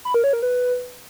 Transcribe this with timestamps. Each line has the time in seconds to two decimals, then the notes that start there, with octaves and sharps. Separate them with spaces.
0.05 B5
0.14 A#4
0.24 C#5
0.33 A#4
0.42 B4